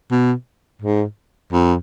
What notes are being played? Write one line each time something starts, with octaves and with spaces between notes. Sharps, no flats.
B2
G#2
F2